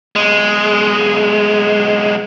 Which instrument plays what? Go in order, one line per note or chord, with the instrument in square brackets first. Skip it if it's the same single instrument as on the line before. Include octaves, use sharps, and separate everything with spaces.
[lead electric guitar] B1 G#3